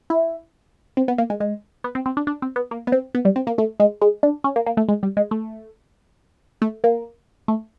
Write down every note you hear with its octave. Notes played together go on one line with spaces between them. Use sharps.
E4
C4
B3
A#3
G#3
G#3
B3
C4
C4
D4
D4
C4
B3
A#3
B3
C4
B3
G3
C4
A#3
A3
G#3
G#3
D4
C#4
A#3
A#3
A3
G#3
G3
G#3
A3
A3
A#3
A3